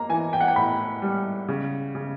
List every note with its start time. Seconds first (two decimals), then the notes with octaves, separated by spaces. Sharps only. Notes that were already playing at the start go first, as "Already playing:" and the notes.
Already playing: A#3 A#5
0.09 E3 G#5
0.33 G5
0.40 F#5
0.48 G5
0.56 A2 B5
1.02 G3
1.48 C#3
1.95 C#3